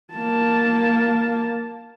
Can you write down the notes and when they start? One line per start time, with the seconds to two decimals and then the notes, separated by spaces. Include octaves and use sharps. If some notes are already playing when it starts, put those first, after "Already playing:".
0.13 A#3 A5